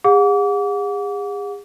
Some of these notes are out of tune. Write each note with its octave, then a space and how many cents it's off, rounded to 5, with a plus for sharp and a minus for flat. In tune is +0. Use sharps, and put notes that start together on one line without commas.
G#4 -40 F#5 -35 D6 -35